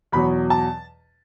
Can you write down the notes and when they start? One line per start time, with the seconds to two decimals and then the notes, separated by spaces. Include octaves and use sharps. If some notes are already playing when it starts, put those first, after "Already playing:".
0.12 E2 B2 F#3 B5
0.50 A5